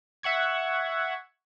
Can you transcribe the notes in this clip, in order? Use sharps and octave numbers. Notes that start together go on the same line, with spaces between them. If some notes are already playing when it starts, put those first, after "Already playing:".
E5 F#5 C#6 G#6